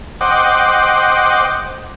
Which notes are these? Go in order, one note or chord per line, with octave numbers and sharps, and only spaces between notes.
C5 D#5 F#5 G5 D6